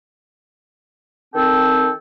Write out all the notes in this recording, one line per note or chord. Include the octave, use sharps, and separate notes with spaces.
D#3 C4 A4 G5 A5